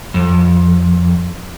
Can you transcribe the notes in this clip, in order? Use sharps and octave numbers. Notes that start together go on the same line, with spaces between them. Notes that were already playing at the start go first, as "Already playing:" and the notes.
F2